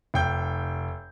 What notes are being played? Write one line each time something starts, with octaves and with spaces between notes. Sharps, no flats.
F1 G5 G6